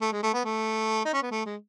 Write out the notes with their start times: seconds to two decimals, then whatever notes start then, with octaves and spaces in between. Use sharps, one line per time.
0.01 A3
0.12 G#3
0.23 A3
0.34 B3
0.44 A3
1.05 D#4
1.13 C#4
1.23 B3
1.31 A3
1.46 G#3